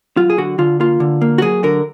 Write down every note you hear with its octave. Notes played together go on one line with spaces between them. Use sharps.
F#3 F4
G#4
D3 F#4
D3 F4
A#3 F4
D3
A#3
F#4
F#3 G#4
D3 A#4